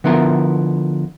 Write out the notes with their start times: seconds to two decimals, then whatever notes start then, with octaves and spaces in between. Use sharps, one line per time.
0.04 D3 F3 B3 E4 A#4